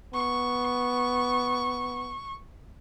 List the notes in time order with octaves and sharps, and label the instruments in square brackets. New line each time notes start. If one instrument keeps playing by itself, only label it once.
[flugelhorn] B3 [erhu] C#6